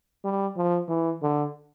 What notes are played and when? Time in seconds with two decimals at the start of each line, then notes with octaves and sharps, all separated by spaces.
0.24 G3
0.57 F3
0.89 E3
1.22 D3